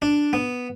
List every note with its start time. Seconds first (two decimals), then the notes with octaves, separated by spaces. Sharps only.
0.02 D4
0.33 B3